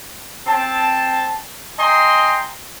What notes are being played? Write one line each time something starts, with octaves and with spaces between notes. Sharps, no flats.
C4 A5
D#5 G5 G#5 A#5 C6